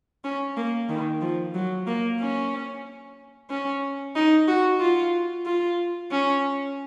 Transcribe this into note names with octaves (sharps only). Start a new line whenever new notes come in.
C#4
A#3
D#3
F3
F#3
A#3
C#4
C#4
D#4
F#4
F4
F4
C#4